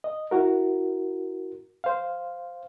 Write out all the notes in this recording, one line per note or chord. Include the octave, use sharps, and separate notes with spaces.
D#5
E4 F#4 A#4
C5 F5